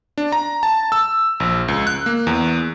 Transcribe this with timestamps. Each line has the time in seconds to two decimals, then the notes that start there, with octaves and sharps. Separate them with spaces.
0.18 D4
0.32 A#5
0.63 A5
0.92 E6
1.40 A#1
1.68 C#2
1.87 F#6
2.06 A#3
2.27 E2